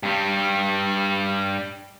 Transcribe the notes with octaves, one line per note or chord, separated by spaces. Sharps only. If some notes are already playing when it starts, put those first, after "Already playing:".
G2 G3